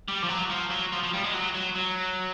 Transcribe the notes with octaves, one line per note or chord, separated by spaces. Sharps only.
G3
F3
F#3
F3
F#3
F3
F3
G3
G#3
F#3
F#3
F#3